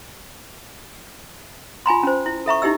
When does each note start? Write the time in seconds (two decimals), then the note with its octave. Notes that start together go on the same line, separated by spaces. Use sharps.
1.86 F4 G#5 A#5 C6
2.03 C#4 C5
2.26 E4
2.46 A4 E5 A#5 C#6
2.62 D#4 E4 G4 D#5 E6